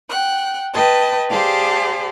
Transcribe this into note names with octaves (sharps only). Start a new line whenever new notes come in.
F#5 G5 F#6
B4 D#5 G5 A5
G4 G#4 C5 D5 F5 A5